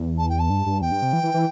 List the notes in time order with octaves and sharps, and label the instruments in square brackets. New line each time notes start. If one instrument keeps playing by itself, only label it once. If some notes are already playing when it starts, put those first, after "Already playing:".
Already playing: [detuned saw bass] E2
[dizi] A5
G5
A5
[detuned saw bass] G2
G2
[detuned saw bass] E2 [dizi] G5
[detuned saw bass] G2
C3
E3
E3
E3